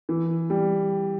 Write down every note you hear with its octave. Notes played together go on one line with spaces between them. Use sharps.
E3
G3